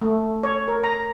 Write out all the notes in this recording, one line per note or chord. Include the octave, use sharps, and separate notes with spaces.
A3
C#5
A#4
A#5